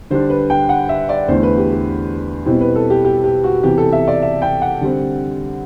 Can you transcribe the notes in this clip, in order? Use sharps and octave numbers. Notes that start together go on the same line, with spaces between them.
D3 G3 D4 C5
B4
G5
F#5
E5
D5
E2 D3 A3 E4 C5
B4
G4
G4
B2 G3 C4 E4
B4
A4
G4
G4
G4
F#4
C3 E3 B3 G4
A4
E5
D5
E5
G5
F#5
D3 G3 C4